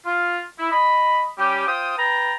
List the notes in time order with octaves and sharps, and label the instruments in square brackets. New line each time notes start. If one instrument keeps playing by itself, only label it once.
[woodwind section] F4
E4
D#5 B5
G3 C#4 G4
F4 C5 G5 D#6
B4 G5 A5 A#5